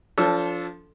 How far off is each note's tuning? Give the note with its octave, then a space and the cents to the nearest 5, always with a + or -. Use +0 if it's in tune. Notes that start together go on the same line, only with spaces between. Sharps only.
F3 +0 D4 -35 A4 +0